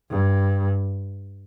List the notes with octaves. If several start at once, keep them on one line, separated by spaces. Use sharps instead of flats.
G2